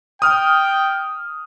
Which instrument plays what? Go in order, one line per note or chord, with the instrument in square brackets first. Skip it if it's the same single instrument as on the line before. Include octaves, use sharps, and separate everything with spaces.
[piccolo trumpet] G5 [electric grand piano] D#6 F6